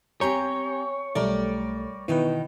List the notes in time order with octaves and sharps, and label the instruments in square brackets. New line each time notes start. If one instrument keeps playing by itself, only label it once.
[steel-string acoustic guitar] C4 G4 A#5 [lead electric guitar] C#5 [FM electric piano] G#5 G6
[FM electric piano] B1 A3 [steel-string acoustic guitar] G3 A#4 D5
[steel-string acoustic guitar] B2 D#3 D#4 [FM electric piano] E3 B4